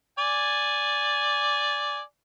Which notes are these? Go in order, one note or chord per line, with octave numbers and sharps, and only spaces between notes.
D5 G#5